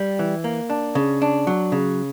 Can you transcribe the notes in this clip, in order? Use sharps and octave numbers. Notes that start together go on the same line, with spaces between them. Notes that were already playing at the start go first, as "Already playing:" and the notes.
Already playing: G3
E3
A#3
D4
C#3
D4
F#3
C#3